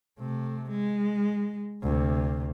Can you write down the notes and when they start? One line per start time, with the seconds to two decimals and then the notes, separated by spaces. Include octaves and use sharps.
0.19 C3 A3
0.70 G#3
1.83 D2 C3